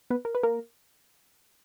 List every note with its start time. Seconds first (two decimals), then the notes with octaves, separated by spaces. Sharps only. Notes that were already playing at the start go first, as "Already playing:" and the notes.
0.10 B3 B4
0.25 A#4
0.35 B4
0.43 A#3 A#4